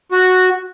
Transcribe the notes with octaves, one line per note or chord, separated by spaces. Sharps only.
F#4